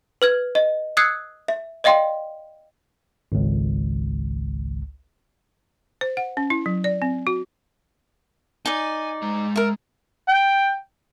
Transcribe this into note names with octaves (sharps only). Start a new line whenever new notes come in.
B4 F6 G#6
D#5
D#6 E6 F#6 G#6 C7 C#7
E5
D5 D#5 F5 G5 C6
G#1 C#2
C5
F#5
C#4
E4
F#3
D5
C4
F#4
D#4 D5 G#5
G#3 A#5
A#4 E5
G5